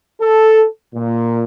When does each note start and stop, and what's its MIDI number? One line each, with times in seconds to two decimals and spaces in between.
0.21 0.65 69
0.94 1.43 46